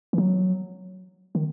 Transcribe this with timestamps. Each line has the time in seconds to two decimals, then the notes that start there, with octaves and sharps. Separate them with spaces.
0.13 E3
0.18 F#3
1.35 D#3